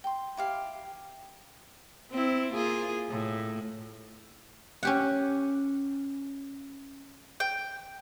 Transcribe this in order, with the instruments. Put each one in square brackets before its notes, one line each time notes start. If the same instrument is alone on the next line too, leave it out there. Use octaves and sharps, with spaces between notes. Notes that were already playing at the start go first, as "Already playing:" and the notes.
[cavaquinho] G5 C6
E4 G4 F5
[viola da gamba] C4 E4
A#3 F4 G#4
A2
[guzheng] C#4 G4 F#5
[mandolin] G5